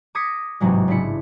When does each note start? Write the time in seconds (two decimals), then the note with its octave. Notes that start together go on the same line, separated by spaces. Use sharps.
0.15 D6 D#6 G#6 A#6 B6 C#7
0.60 A1 G#2 C3 F#3 G#3
0.88 C#3 D4 E4 C#7